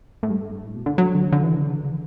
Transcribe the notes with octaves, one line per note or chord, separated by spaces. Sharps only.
A2
G2
A2
B2
D3
F#3
D3
D3
E3
D3
C#3
D3
C#3
E3